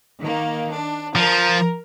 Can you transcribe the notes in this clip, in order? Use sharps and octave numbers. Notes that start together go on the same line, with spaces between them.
D#3 A#3
D4
F3 A#4